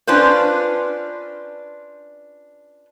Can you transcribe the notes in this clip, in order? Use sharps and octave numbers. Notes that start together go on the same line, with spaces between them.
C#4 D4 F4 B4 C5